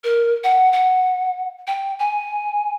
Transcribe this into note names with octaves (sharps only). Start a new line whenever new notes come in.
A#4
F#5
F#5
G5
G#5